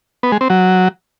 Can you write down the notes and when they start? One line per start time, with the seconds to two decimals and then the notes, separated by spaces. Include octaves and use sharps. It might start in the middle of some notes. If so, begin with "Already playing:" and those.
0.23 B3
0.32 G#3
0.41 C4
0.50 F#3